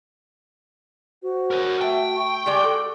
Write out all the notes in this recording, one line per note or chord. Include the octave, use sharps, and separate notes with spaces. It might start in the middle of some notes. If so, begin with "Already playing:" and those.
F#4 C5
A#4 C#5
A3 E5 G5
C#6
G3 G#3 D5
F#4 A4